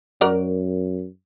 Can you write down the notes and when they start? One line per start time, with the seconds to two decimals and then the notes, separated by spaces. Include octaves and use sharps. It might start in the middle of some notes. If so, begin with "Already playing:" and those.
0.21 F#2 F#4 A#4 D5